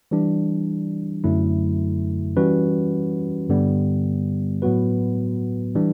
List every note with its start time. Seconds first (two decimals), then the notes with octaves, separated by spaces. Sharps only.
0.11 E3 G3 D4
1.24 F#2 D3 F#3 A3 E4
2.37 E3 G3 C#4 F#4 B4
3.49 G2 D3 G3 B3
4.62 A2 F#3 B3 F#4 B4
5.75 E3 G3 D4